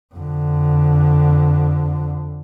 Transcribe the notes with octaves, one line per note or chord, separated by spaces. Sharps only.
F2 D3